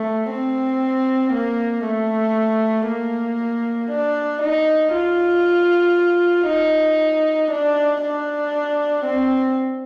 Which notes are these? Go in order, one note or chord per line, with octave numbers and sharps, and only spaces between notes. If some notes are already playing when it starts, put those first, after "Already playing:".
Already playing: A3
C4
A#3
A3
A#3
D4
D#4
F4
D#4
D4
D4
C4